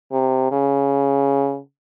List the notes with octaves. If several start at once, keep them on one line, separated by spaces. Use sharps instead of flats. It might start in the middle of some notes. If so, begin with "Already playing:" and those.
C3
C#3